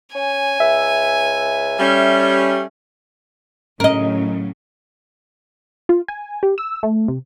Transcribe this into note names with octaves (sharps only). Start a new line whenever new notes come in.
C#4 G#5
C#2 E5
G3 A3 C#4
A2 C#3 F#3 A#4 D#5
F4
G#5
G4
E6
A3
C3